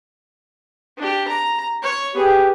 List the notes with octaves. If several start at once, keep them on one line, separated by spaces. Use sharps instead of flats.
D4 G4
A#5
C#5
B3 G4 G#4